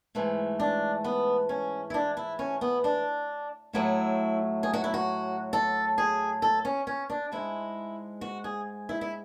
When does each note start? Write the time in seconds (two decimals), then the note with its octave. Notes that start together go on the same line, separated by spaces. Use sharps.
0.15 G#2 E3 A3
0.60 D4
1.04 B3
1.49 C#4
1.90 E4
1.94 D4
2.17 E4
2.39 C#4
2.61 B3
2.84 D4
3.73 A2 F#3 A3 E4
4.63 G#4
4.73 F#4
4.84 E4
4.94 F#4
5.53 A4
5.98 G#4
6.42 A4
6.65 C#4
6.87 C#4
7.10 D4
7.32 G#2 G#3 E4
8.21 F#4
8.44 G#4
8.89 E4
9.01 E4